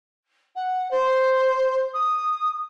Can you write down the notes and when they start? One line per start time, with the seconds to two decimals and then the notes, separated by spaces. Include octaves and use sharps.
0.55 F#5
0.90 C5
1.93 D#6